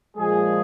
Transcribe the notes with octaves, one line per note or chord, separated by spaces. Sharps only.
A#2 F3 G#3 G#4